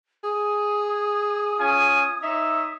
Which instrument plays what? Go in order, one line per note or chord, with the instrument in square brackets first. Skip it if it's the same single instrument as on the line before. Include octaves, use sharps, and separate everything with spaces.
[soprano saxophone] G#4 [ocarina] D#6
[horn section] C#4 F4 G#5
[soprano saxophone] D#4 [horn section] C#5 E5